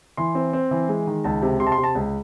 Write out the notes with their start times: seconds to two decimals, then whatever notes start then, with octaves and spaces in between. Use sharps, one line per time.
0.17 E3 C6
0.35 C4
0.53 C4
0.71 E3
0.89 G#3
1.07 D#3
1.24 C#2 A5
1.42 C3
1.60 C3 C6
1.67 A5
1.72 C6
1.78 C3
1.84 A5
1.95 C#2